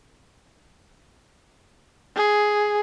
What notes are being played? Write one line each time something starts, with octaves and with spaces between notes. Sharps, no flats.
G#4